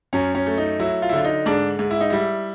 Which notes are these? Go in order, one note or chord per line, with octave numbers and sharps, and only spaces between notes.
F#2 C#4
C#4
A3
D#4
F#3 E4
F4
E4
D3 F4
D#4
G#2 D4
G#2
E4
D#4
G3 E4